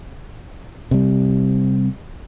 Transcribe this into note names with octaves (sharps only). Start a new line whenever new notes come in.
C3 G3